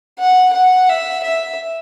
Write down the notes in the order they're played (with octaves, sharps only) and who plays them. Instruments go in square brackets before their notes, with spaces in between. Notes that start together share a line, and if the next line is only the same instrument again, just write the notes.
[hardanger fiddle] F#5
F#5
E5
E5